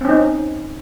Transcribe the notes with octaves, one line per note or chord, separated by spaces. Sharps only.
C4 C#4 D#4